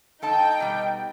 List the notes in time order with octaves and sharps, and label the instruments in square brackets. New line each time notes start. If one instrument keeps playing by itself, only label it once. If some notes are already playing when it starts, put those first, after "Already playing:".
[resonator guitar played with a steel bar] G#3 A4 A5 [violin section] D#4 G5
[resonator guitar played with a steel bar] B2 G3